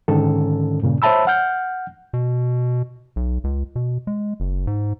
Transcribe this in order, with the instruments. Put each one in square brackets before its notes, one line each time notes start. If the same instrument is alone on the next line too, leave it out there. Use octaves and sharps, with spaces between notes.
[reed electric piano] G#2 D3 D#3 C#4 A4
G2 A#2 C#3
C5 C#5 E5 A5 B5 E6
F#5 F6 G6
[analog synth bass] B2
B1
C#2
B2
G#3
F#1
G#2